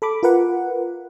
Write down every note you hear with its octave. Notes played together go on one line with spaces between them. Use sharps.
A4 B5 D6
F4 A#4 B4 F#5